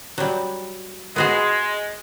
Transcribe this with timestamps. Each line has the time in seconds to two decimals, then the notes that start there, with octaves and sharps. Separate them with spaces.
0.18 F#3 G3
1.16 G#3 B3 F#4 G#4